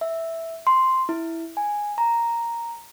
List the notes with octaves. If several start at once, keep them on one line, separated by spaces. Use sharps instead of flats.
E5
C6
E4
G#5
A#5